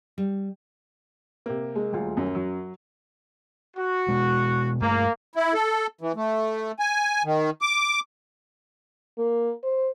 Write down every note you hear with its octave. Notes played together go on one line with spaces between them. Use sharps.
G3
C3 A#3
G#3
D#1 D2 F4
F#2
F#3
F#4
B2 G#3
G2 A3 A#3
E4
A4
E3
A3
G#5
D#3
D6
A#3
C5